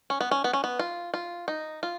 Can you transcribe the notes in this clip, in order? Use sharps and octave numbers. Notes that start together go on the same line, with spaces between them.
C#4
B3
C#4
B3
C#4
B3
F4
F4
D#4
F4